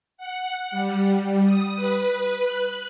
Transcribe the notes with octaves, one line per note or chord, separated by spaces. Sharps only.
F#5
G3
D#6
B4
F#6